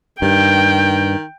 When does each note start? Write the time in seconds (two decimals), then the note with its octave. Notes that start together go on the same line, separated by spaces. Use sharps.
0.22 G2 D#3 G5